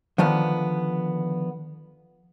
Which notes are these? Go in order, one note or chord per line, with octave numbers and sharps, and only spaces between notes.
D3 D#3 F3 B3